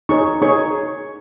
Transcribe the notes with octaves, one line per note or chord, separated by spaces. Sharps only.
D#4 G#4 C#5 C#6
D#4 G#4 C#5 C#6